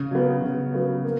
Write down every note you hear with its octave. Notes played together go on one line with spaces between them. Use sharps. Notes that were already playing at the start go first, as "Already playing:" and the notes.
Already playing: C#3
F#3 B3
C#3
F#3 B3
A#3